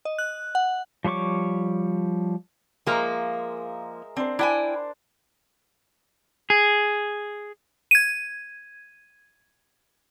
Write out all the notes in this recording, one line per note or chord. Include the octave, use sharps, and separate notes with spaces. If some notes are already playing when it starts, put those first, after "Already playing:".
D#5
F#6
F#5
F3 G3 C#5 C#6 D6
F3 G#3 A#3 A#4 E5
C4 D4 C5
D4 E4 G5 G#5
G#4
G#6 D#7